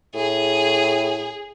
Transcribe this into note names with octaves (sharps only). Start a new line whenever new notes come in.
A2 G#4